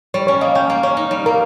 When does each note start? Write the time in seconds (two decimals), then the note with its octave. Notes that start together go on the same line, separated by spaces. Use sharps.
0.14 G3 C#5
0.27 C#4 C#5
0.41 A#3 D#5
0.55 C#4 G5
0.70 A#3
0.83 C#4 C#5
0.97 D#4
1.11 G3
1.26 A#3 A#4